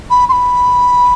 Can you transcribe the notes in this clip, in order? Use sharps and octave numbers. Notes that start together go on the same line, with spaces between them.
B5
C6
B5